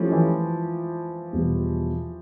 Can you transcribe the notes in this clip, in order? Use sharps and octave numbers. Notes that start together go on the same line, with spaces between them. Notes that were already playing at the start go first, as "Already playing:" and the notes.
Already playing: F3 F#3 A3 C#4 E4 G4
E3
E2 B2 G3